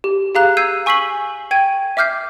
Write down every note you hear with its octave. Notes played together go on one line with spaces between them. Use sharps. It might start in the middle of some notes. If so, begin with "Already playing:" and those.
G4
G4 G#4 F5 A#5 F#6
E6 G6 G#6 C7 D#7
G#5 C#6 E6 B6 C7 F#7
G5 G#6 D#7
E5 D6 F6 G6 C7